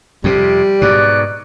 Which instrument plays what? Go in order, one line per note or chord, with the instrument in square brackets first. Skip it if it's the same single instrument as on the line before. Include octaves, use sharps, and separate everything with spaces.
[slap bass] F2 C3 [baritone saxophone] G3
[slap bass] G#2 B2 [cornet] D5 [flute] F#6